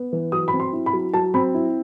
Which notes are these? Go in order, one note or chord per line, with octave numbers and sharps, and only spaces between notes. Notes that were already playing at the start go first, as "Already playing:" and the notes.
Already playing: B3
E3
F#3 D#6
B5
C4
C6
E4
B5
F#3
F#3 A5
C4 B5
E4